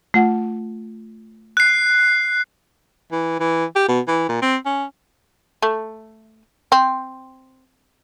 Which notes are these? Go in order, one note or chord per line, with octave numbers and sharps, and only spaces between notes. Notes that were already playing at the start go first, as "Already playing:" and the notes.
A3 F4 F#5
F#6 C7
E3
E3
G4
B2
E3
A#2
C4
C#4
A3
C4